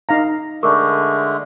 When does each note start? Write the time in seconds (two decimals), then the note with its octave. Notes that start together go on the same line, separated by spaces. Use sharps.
0.09 D#4 F5 A#5
0.63 D3 G#3 A3 A#4 C#6 D6